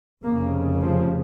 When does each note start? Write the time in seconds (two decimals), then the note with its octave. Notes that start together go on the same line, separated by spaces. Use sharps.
0.23 F1 F2 C#3 A#3
0.81 F3